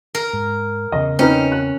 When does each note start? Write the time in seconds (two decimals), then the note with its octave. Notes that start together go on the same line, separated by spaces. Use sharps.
0.15 A#4
0.33 G#2
0.92 E2 C#3 D#5
1.19 C4 C#4 D#4 B4
1.52 F#6